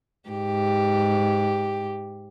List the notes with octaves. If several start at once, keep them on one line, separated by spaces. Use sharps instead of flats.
G#2 G4